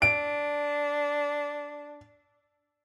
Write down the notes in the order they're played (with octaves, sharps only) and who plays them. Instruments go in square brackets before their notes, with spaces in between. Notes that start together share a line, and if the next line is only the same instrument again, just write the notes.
[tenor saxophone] D4 [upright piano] D7